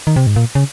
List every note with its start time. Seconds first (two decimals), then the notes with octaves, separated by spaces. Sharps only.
0.07 D#3
0.16 C3
0.27 G#2
0.36 A#2
0.55 C#3